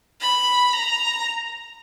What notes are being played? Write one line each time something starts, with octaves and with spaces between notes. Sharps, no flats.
B5
A#5